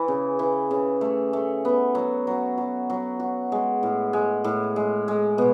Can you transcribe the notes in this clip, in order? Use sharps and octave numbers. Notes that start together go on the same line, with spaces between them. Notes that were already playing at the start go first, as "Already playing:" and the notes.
Already playing: E3
C#3
E3
C#3
A3
A3
B3
F#3
F#3
F#3
F#3
F#4
G#3
A2
G#3
A2
G#3
G#3
B2